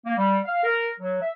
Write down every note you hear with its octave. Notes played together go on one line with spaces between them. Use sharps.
A#3
G3
F5
A#4
F#3
E5